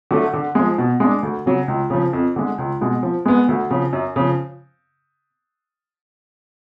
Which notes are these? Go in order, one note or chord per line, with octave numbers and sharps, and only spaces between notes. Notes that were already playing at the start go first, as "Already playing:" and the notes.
D3 F#3 A3
D3
F3 G#3
B2
G#3 D4
D2
C#3 F#3
C#2
C#3 F3
F2
D3 G#3
C#2
B2 G#3
F3
G#3 B3
D2
C#3 F3
F#2
C#3 F3